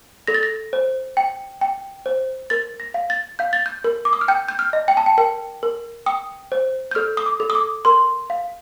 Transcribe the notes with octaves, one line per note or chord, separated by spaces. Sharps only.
A4 A#6
A6
A#6
C5
G5
G5
C5
A#4 A6
A#6
F5
A6
F5 G6
A6
G6
A#4
D6
D#6
F6
G5 G6
G6
F6
D#5
G5
A5
G5
A#4 G5
A#4
G5 D#6
C5
G6
A4 F6
D#6
D6
A4
D#6
D6
A#4 C6
F5